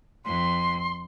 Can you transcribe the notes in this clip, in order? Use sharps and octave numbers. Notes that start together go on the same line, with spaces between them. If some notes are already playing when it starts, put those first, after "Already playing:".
F2 C6